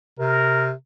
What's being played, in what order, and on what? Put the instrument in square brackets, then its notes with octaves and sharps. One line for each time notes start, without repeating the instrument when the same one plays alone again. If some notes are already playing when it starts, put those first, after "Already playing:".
[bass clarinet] C3 [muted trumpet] A#4